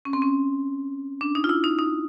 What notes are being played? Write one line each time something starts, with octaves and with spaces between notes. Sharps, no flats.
C#4
C4
C#4
D4
D#4
F4
E4
D#4
D#4